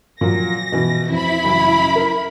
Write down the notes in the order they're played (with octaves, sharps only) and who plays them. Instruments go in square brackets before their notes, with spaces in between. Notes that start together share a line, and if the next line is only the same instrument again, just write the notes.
[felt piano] A#2 F3 F#3 [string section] A#6
[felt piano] B2 E3
[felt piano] F2 [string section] E4 B5
[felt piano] A1 F#2 C#3
A#4